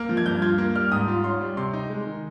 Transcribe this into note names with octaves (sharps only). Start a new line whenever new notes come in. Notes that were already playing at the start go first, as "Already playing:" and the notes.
Already playing: A#3 F6
F3
G#6
G2 G6
F4 G#6
A#3
G3 F6
G#2 D#6
F4
C#4 C6
G3
C3 C6
D#4
G#3
D#3